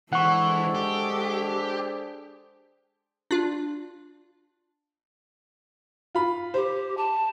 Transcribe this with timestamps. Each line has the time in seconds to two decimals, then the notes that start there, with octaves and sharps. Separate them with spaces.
0.13 E3 G#3 D4 G#4 A4 C5 F#5 C#6
0.75 G4
3.31 D4 F4
6.15 F4 B5
6.54 G4 C5
6.97 A5